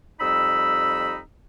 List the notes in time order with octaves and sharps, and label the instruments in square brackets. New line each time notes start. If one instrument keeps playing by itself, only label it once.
[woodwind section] F2 G3 D#4 B5 E6